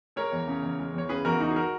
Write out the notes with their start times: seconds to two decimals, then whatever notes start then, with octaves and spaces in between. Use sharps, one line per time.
0.16 G#3 A#4 C#5
0.32 E2
0.48 C#3
0.63 E2
0.79 G#3
0.94 E2 C#5
1.09 C#3 G#4 B4
1.25 E2 F#4 A#4
1.40 G#3 D#4 F#4
1.51 G#4
1.56 F#4 A#4